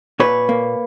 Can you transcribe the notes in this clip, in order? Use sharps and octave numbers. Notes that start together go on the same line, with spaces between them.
A#2 B4 C#5
A#3